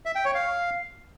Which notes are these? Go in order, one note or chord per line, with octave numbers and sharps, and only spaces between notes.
E5
G5
C#5
F5